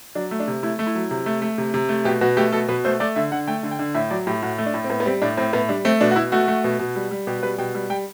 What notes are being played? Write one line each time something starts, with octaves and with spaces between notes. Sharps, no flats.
F#3 D4
A3
D4
C3
A3 E4
A3
E4
F#3
C3
A3
A3
C3
C3
A3
B2 G4
B2 F#4
A3 G4
B2 A4
B2 B4
A3 C5
A3 D5
D3 E5
D3 F#5
A3 G5
D3
G5
D3
A2 E5
F#3 D5
A2 G4
A2 F#4
A3
D4
A2
C4
A2 B3
B3
G3 C4
A2 D4
A2 C4
A2 B3
G3 D4
A3 C4
B2 D4
F#4
B2 E4
A3 F#4
A3
B2
B2
G3
G3
B2 G4
G3 B4
B2 G5
G3
G3 G5